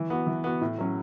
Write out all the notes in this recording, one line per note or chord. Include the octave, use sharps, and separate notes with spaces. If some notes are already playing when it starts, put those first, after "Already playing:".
Already playing: E3
B3 F#4
E3
B3 F#4
A2
F#3 C#4